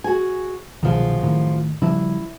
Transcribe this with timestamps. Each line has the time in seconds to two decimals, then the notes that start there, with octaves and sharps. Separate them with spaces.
0.04 F#4 G#4 G#5
0.83 C2 F#2 B2 D#3 F3 G#4
1.23 A2 D#3
1.82 C#3 F3 G3 E4